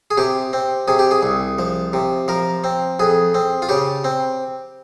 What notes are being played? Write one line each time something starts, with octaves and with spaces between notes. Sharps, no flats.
G#4
C3 G4
C4
C3 G#4
G4
G#4
C2
F3
C3
F3 A#4
C4
F2 G#4
C4
F4
C#3 G4
C4